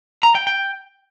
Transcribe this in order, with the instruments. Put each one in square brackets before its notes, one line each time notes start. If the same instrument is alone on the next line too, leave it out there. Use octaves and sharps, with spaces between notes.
[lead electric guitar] A#5
G5
G5